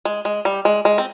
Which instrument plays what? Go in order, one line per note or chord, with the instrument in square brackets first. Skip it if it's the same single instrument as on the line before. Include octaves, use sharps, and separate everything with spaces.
[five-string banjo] G#3
G#3
G3
G#3
G#3
C4